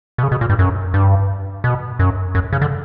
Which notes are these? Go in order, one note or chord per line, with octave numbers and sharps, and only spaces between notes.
B2
C#3
B2
A#2
G2
F#2
G2
B2
F#2
F#2
C#3
D3